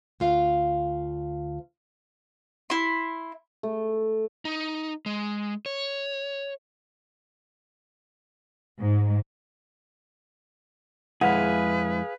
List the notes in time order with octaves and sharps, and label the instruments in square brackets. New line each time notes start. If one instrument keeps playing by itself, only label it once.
[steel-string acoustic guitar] D2 F4 F5
[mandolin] E4 C6
[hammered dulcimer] A3
[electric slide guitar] D#4
G#3
C#5
[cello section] G#2
[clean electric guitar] F2 G#3 E4 [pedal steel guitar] G#4 F5 [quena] B4 [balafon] F#5